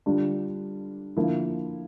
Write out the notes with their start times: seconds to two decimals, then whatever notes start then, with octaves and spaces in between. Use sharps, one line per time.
0.06 D3 G3 D4 F4
1.17 D3 F3 A#3 E4